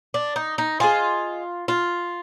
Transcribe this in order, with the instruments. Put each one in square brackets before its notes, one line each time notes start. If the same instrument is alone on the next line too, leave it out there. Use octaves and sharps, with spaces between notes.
[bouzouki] D4
D#4
D#4
[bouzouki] F4 [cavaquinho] G#4 C5 D#5 G#5
[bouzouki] F4